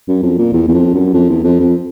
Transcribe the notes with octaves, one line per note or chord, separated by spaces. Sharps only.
F#2
F2
A#2
E2
E2
F2
F#2
F2
E2
F2
F2